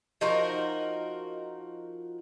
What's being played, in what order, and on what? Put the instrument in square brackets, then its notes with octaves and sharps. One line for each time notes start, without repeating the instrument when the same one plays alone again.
[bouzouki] F3 D#4 F#4 A#4